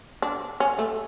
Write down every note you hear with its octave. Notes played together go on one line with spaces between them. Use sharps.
D4
C#4
A3